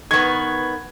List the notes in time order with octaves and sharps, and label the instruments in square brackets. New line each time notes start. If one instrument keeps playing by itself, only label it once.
[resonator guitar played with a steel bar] D#3 B3 [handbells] B4 C#6 [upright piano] G#6